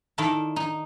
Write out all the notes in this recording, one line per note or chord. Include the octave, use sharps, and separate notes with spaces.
D#3 E4 A4 D5 A5
D#4